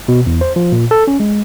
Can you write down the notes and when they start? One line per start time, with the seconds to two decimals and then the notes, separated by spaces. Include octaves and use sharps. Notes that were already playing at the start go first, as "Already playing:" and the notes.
0.08 B2
0.26 E2
0.41 C5
0.56 F3
0.72 A#2
0.91 A4
1.07 C#4
1.20 G#3